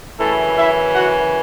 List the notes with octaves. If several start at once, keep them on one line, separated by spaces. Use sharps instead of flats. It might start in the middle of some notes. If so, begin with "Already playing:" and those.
F#2 C#3 E3 A3 C#4 E4 A4
E4 E5
F#4 F#5